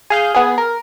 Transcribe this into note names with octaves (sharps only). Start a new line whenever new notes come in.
G#4 F5 G6
B3 G#4
A#4